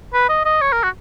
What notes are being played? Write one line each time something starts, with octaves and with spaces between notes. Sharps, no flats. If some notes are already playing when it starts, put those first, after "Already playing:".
B4
D#5
D#5
C#5
A#4
F#4